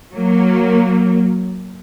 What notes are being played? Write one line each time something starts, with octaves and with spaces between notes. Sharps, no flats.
F#3 A#3